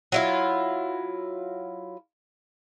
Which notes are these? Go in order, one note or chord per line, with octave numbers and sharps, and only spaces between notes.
F#3 E4 F4